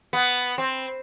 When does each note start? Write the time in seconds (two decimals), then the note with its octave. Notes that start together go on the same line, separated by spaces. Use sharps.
0.13 B3
0.58 C4